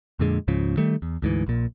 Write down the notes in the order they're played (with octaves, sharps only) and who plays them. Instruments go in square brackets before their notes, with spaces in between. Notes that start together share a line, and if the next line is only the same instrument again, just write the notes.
[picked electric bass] F2 A#2 D3 G#3
C#2 G#2 C#3 F3
D#3 G3 A3
E2
D2 G#2 E3
A#1 A#2